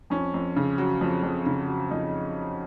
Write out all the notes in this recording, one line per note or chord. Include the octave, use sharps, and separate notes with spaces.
F2 C#4
F2
C#3
F#3
F2
F2
C#3
F#3
F2 D#4